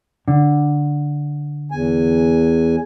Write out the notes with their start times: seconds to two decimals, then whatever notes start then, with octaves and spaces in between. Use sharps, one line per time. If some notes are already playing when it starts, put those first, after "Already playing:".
0.28 D3
1.71 E2 G#5